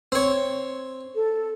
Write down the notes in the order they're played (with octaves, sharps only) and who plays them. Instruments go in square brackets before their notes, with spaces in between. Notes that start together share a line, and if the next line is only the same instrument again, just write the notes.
[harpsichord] C4 C#5
[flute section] A4